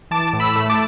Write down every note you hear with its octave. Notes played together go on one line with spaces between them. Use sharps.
E3 A5 D6
A2
B5 E6
A3
A5 D6